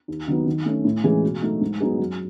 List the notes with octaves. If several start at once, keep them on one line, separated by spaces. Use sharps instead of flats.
D#2
D#3 F#3 B3
D#3
A3 C#4
A2
E3 G#3 C#4 G#4
B2
F#3 A3 D#4
G#2
F#3 B3 D#4 G#4
F#2